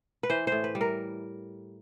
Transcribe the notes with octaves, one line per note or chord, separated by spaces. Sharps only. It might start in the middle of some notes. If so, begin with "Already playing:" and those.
B4
E3 C5
A2 C5
B4
G3
A#4